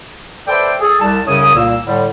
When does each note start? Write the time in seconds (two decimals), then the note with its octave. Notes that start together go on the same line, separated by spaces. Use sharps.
0.47 A4 B4 C5 D5 E5 G5
0.81 G#4 A4
1.00 C2 A5
1.27 C2 F#2 C#3 C#5 D#6
1.54 C2 A#2 A#3 E6
1.85 A2 D3 G3